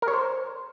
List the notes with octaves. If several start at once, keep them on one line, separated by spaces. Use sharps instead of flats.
A#4
C#5
C5